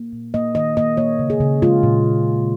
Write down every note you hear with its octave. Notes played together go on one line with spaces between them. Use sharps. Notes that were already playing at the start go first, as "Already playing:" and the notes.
Already playing: A#3
A#2
A#3 D#5
D#3 D#5
A#3 D#5
A#3 C#5
C#3
G#4
C#3
G#3 F4
A#2